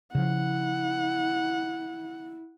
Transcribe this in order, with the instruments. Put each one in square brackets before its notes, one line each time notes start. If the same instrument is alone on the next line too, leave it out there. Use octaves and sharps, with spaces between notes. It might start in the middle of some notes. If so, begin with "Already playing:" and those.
[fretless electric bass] C#3 F3 [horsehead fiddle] E4 [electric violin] F#5